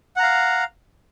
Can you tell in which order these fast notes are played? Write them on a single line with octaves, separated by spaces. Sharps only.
F#5 A#5 F5